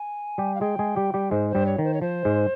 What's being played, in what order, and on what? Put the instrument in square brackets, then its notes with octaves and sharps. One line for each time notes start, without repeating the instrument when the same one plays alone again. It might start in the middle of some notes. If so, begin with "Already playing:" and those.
Already playing: [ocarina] G#5
[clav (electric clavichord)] G3 G4
[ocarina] F5
[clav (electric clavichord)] G#3 G#4 [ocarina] G5
[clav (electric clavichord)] G#3 G#4
G3 G4
G3 G4
[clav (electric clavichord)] G#2 G#3 [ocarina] C5
[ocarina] C5
[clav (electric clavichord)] G2 G3
[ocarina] C#5
[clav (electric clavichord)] D#3
[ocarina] C5
C#5
[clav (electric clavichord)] F3 [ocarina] C5
[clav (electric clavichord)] G#2 G#3